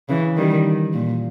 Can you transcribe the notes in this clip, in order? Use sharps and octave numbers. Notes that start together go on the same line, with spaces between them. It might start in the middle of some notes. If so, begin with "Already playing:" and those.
C#3 E3
D#3 G3
A#2